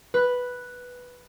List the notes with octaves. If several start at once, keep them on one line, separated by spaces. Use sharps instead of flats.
B4